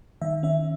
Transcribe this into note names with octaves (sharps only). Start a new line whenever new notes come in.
D#3 E5
C#4 E5